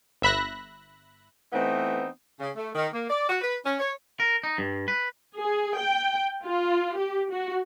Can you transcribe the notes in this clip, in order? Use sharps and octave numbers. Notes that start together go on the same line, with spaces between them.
G1 E5 B5 F#6 A#6
E3 A3 B3 C4 D#4
C#3
A3
D#3
A#3
D5
F#4
B4
C#4
C#5
A#4
D#4
G2
B4
G#4
G5
F4
G4
F#4